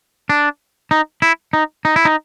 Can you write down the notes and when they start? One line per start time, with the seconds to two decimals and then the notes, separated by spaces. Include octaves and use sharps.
0.29 D4
0.91 D#4
1.22 E4
1.53 D#4
1.85 D#4
1.96 E4
2.05 D#4